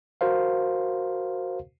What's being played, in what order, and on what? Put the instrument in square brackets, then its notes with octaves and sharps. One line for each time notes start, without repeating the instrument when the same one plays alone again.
[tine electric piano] F#4 A#4 C5 F5